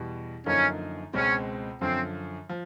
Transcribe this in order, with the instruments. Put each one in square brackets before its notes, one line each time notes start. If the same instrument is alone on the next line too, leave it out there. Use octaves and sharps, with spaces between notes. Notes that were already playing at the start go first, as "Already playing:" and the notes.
Already playing: [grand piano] E2 B2 G3
[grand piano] F#2 D3 F3 A#3 D#4 [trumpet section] C#4
[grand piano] C#2 B2 G#3 C4 [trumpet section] C#4
[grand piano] F#2 D3 F3 [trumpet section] C4
[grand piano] F3